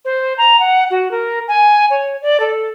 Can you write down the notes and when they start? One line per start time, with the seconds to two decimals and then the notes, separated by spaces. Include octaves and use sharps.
0.05 C5
0.38 A#5
0.60 F#5
0.91 F#4
1.11 A#4
1.48 G#5
1.90 C#5
2.22 D5
2.40 A4